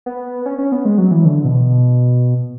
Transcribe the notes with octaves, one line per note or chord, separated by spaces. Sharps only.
B3
C#4
C#4
B3
G#3
F#3
E3
D3
B2